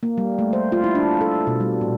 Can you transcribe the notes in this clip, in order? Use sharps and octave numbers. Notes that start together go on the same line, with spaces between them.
A#3
G3
A3
C5
F4
E4
D4
A4
B2
G3
A#2